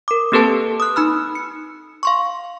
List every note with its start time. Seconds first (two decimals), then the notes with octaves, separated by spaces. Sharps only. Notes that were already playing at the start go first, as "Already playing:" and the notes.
0.08 A#4 D6
0.32 A#3 C4 G4 A4 B4 A5
0.80 D#6 F#6
0.96 D#4 B5 F6
1.35 C#7
2.03 F5 C6 C#6